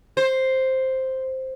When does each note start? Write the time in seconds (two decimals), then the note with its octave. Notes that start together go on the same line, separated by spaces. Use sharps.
0.17 C5